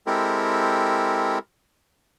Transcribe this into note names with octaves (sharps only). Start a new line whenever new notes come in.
G#3 C4 E4 G4 A4 A#4